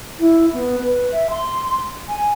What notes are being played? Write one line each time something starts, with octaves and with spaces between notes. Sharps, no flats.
E4
B3
B4
E5
C6
G#5